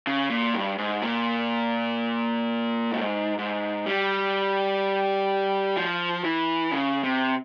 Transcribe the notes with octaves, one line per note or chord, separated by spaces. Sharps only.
C#3
A#2
G2
G#2
A#2
G#2
G#2
G3
F3
E3
C#3
C3